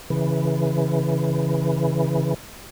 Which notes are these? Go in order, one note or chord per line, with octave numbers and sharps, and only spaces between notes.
C#3 E3